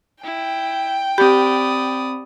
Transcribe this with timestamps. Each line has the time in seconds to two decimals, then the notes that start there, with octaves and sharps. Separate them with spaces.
0.24 E4 G5
1.18 C4 G4 D5 B5 D#6